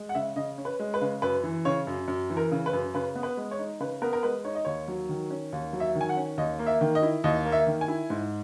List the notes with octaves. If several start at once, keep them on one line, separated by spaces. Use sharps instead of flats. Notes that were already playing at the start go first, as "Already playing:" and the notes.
Already playing: G#3
F#5
C#3 E5
C#3 D#5
C#4
B4
G#3
B4
C#3
F#2 B4
E3
C#3 C#5
F#2
F#2
E3
A#4
C#3
B4
F#2
C#3 B4
B3
B4
G#3
C#5
D#4
C#3 B4
B3 A#4
A#4
G#3 B4
D#4 C#5
D#5
D#2 C#5
F#3
D#3
C#4
D#2
F#3
E5
D#3
G#5
F#5
C#4
D#2 D#5
A#3
E5
D#3
D#5
E4
D#2 D#5
A#3
E5
D#3
G#5
E4
G#2